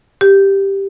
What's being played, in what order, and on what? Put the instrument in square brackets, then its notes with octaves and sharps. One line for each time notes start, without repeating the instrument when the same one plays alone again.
[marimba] G4